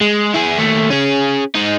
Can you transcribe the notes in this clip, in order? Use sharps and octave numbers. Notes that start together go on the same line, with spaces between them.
G#3
E4 G#4
D#2 A3
C#4 G#4
G#3 D#4